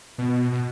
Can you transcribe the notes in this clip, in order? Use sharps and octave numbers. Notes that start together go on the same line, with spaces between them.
B2
B2